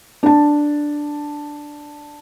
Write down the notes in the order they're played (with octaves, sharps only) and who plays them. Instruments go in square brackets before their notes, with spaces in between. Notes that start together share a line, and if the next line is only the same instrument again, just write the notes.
[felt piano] D4 A5